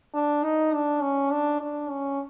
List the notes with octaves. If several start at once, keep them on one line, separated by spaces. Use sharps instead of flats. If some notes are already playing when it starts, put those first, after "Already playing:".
D4
D#4
D4
C#4
D4
D4
C#4